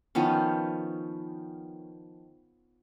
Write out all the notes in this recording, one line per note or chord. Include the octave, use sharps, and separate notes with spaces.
D#3 F3 B3 C#4